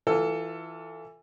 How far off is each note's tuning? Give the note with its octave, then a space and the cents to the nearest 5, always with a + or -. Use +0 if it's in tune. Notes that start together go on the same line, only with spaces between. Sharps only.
E3 +0 F4 +20 A4 +20